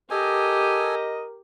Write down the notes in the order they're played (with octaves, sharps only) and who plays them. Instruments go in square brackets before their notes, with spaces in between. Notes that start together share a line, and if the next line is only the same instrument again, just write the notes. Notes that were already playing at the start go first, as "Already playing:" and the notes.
[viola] G4 [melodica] A4 G#5 [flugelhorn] A#4 [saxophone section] D#5